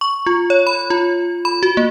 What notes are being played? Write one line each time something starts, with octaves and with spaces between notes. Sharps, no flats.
C#6
F4
C#5
B5
F4
B5
F#4
A#3